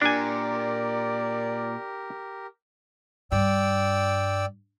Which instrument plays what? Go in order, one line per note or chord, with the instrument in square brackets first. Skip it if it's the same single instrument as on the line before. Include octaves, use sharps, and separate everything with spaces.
[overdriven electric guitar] A#2 [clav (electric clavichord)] D4 G#5 [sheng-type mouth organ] G4 A#4 [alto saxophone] D5
[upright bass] G2 [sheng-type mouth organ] D5 G5 E6